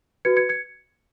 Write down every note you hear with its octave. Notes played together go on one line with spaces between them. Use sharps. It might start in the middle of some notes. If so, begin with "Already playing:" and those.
F#4 B4 G#6 C#7
G#6 C#7
G#6 C#7